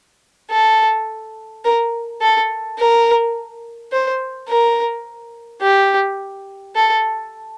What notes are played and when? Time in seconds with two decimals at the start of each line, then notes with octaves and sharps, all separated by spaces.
0.51 A4
1.65 A#4
2.21 A4
2.78 A#4
3.92 C5
4.48 A#4
5.62 G4
6.76 A4